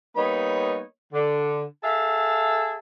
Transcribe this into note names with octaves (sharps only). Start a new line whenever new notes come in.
G3 A#3 B3 D#4 C#5 B5
D3
G#4 A4 E5 F5 A5